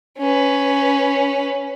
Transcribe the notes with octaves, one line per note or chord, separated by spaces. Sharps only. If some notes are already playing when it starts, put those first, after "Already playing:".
C#4 B4